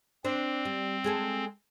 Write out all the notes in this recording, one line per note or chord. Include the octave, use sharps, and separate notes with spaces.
C4 D4 C5
G3
G#3 G#4 A4